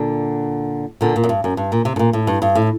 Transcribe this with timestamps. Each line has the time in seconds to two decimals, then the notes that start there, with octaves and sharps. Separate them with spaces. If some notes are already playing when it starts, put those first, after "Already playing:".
Already playing: A#2 D3
1.01 A#2 D3
1.16 A#2
1.24 F#2
1.29 G2
1.44 F#2
1.57 G2
1.72 A#2
1.85 C3
1.96 A2
1.99 A#2
2.13 A2
2.27 G2
2.42 G2
2.55 A2